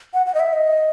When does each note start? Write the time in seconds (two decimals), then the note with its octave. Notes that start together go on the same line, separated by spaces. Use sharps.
0.14 F#5
0.26 F#5
0.35 D#5
0.40 E5
0.53 D#5